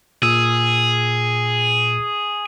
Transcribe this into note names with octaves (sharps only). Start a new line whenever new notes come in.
A#2 G#4 E6